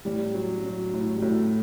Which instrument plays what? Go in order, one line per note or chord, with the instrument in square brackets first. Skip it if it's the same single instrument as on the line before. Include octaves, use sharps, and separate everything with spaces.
[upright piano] A2 [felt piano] G3
[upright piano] F#3
F#3
A2
[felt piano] G3
[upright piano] A2 [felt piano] F#3 A3